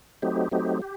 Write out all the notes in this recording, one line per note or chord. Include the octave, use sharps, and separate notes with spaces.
F#3 A3 C4 D#4 G4
F#3 A3 C4 D#4 G4
G4